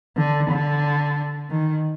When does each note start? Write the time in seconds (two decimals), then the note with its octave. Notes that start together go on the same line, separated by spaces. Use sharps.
0.17 D3
0.50 D3
1.50 D#3